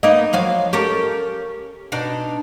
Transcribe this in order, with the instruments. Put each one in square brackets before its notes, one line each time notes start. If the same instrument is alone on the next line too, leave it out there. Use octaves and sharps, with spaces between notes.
[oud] A#3 B3 D#4 [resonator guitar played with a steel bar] D#5
[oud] F3 F#3 F5
[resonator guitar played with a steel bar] C#4 [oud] G4 A4 A#4
[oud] B2 D4 D#4